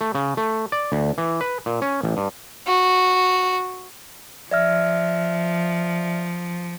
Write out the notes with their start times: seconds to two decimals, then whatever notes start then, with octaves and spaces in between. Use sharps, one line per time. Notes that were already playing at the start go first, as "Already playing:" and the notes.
0.01 A3
0.15 C#3
0.37 A3
0.72 D5
0.92 D2
1.18 E3
1.41 B4
1.66 A#2
1.82 C#4
2.03 A1
2.17 G2
2.67 F#4
4.51 F3 D5 E5 F6